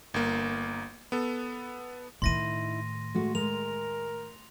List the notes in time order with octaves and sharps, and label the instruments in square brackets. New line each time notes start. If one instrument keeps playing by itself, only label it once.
[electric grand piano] G1 A#3
B3 A4
[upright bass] A2 D#3 [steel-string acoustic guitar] D#4 E4 [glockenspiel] C6 A#6 D#7
[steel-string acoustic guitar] G#3 A3 F#4
[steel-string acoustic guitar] G#3 [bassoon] A#4 [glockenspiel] F7